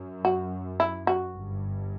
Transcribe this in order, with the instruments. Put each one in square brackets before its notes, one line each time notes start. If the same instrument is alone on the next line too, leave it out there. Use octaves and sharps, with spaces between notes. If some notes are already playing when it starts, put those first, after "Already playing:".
Already playing: [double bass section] F#2
[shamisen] F#4
E4
F#4
[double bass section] G1 G2